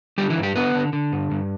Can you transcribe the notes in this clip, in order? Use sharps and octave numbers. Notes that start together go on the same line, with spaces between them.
D3 G3 G4
E3 E4
G2
G3 G4
D3 B3 B4
D3
D3
G2
G2